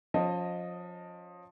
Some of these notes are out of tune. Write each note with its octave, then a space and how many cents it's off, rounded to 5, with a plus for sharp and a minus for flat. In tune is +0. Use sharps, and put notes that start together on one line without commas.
F3 +20 C#4 +0 D#5 +0